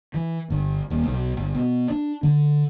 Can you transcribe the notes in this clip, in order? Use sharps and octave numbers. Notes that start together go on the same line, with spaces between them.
E3
G1
D#1
B1
G1
B2
D4
D3